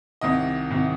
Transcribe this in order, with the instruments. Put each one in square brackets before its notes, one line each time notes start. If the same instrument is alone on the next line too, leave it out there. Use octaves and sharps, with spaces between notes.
[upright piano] C2 C3 D#3 D#5
C2 C3 D#3